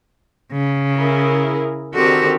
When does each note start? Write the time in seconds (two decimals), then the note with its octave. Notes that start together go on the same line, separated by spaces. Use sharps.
0.52 C#3
0.95 E4 G#4 A#4
1.94 D3 D#3 C4 F#4 G4